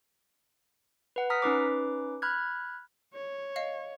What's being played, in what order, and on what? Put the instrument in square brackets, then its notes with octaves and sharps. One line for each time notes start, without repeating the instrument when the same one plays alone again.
[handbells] B4 F#5
A#5 D#6 F6 B6
C#4 D#4 B4 D6
B5 F6 F#6 G#6
[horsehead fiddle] C#5
[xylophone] D#5 F5